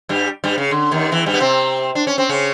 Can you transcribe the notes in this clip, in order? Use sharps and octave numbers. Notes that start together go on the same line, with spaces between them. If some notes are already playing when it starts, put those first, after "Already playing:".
G2 G3
G2 G3
C#3
D3
D#2 D#3
E2 E3
G2 G3
B3
C3 C4
D4
C#4
C4
C#3 C#4